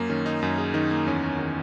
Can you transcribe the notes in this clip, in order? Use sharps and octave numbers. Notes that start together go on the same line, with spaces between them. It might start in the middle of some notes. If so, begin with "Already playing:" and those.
Already playing: F#2 A#3
D#3 C#4
D#4
F#2
G#4
D#3 D#4
A#3
E2 C#4
D#3